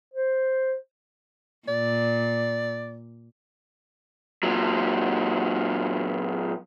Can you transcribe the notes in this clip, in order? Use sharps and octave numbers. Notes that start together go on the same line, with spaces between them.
C5
A#2 D5
A#2 F#3